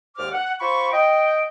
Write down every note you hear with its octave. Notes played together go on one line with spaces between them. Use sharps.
D#2 G#2 C5 D5 D6 F6
F#5
F4 C5 B5 C#6
D#5 G5